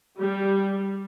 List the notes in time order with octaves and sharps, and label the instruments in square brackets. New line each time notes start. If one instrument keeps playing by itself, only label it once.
[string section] G3